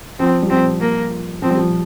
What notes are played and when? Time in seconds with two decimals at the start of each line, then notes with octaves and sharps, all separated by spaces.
0.19 F3 C4
0.43 G3
0.50 F3 C4
0.81 A#3
1.42 F3 C4
1.51 G3
1.58 F3